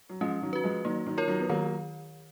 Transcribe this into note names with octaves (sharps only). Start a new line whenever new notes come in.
F#3
F3 G#3 C#4
D#3 F#3
F#4 B4
F3 G#3
D#3 F#3 A#3
D#3 F#3
F4 A#4 C#5
D#3 F#3
B3
D#3 F#3 A#3